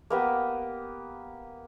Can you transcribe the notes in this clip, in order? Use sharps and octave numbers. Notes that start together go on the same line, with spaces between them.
A#3 B3 G4